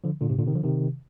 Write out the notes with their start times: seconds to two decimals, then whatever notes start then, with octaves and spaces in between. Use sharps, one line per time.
0.04 D3 F3
0.21 A#2 D3
0.29 G#2 C3
0.38 A#2 D3
0.46 C3 D#3
0.55 D3 F3
0.64 C3 D#3